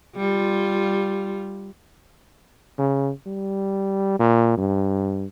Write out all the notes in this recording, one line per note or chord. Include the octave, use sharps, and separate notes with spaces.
G3 F4
C#3
G3
A#2
G2